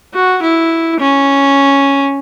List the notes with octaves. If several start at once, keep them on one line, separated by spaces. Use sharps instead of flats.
F#4
E4
C#4